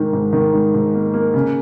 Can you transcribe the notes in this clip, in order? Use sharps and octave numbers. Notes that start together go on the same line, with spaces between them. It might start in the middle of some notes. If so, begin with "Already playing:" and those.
Already playing: G#2 D#3
G#2
D#3
G#2
G#2
A#3
A#3
C#3